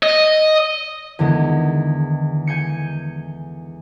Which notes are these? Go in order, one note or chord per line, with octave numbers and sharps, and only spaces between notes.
D#5
E2 D3 D#3 G#3
G#5 G6 C#7